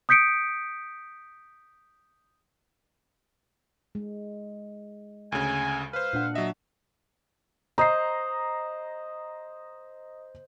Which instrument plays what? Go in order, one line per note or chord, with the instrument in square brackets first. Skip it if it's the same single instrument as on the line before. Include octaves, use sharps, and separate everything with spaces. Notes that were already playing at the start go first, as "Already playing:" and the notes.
[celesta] D#6 G6 B6 C#7 D7
[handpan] G#3
[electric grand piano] D2 C#3 [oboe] G#5
[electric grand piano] B4 C5 [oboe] F5
[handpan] A#2 D4 F#5
[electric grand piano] F#3 E5 [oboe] D#5
[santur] C5 D#5 [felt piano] A#5 C7